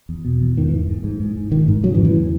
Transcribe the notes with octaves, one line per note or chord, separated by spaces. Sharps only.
E2
B2
E2
G#2 D#3
E3
G#2
G#2
G#2
G#2
G#2
G#2 D#3
G#2
C#3 F#3
E3
E2
E3
C#3